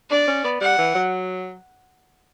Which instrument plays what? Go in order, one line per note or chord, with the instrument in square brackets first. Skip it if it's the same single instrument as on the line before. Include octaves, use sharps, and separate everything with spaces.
[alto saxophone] D4 [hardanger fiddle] D5
[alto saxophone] C#4
B3
[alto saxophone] G3 [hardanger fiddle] F#5
[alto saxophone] E3
F#3